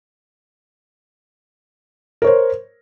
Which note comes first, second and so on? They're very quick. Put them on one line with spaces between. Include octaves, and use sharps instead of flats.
A#4 C#5 C5